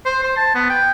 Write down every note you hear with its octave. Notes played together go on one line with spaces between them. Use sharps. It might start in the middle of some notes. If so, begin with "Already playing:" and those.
C5
C5
A5
B3
G5